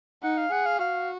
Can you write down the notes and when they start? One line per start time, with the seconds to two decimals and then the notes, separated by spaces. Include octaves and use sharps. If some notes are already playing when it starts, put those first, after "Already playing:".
0.23 D#4 F#5
0.37 F5
0.52 G#4 F#5
0.65 F5
0.79 F#4 F5